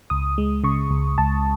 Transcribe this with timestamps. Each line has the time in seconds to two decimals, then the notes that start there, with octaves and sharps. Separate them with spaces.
0.10 C#2 D#6
0.38 G#3
0.64 C#3 C#6
0.91 C#2
1.18 C#2 A5